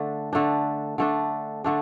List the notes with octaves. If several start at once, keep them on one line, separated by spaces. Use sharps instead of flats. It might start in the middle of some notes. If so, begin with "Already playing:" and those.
Already playing: D3 A3 D4
D3 A3 D4
D3 A3 D4
D3 A3 D4